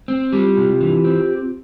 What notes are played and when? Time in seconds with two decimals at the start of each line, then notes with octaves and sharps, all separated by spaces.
0.08 C4
0.32 G3 F4 G4
0.57 C3
0.81 E3
1.04 C4